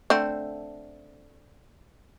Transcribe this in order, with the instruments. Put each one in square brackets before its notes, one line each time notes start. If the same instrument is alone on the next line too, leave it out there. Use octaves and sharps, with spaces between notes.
[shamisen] D3 A3 C4